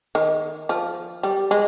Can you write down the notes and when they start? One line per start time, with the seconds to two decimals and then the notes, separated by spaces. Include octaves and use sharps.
0.15 D#3
0.69 F3
1.23 G3
1.51 G#3